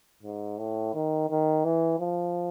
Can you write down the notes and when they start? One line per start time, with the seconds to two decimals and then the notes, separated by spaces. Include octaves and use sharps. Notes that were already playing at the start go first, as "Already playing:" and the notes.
0.23 G#2
0.58 A2
0.94 D#3
1.30 D#3
1.65 E3
2.00 F3